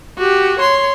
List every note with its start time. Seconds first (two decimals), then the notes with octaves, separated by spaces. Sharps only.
0.18 F#4 G4
0.59 C#5 C6